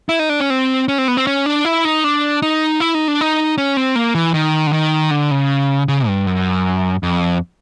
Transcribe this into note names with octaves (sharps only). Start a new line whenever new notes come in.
E4
D#4
D4
C#4
C4
C#4
C4
B3
C4
C#4
D4
E4
D#4
D4
D#4
E4
D#4
D4
D#4
C#4
C4
A#3
E3
D#3
D3
D#3
D3
C#3
C#3
G2
F#2
F2